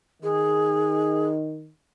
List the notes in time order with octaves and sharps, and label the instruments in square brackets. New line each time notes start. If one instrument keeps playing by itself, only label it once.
[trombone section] D#3 D#4 [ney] G#4